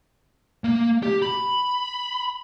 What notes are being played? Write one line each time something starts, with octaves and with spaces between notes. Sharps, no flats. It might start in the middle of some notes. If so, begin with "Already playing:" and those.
A#3
G4
B5